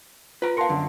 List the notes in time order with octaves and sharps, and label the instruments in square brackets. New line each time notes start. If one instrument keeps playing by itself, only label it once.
[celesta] F4 [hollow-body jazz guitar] B4 A#5
[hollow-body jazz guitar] A#4 F5 [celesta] A5 C6 C#7
[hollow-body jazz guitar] F#2 D3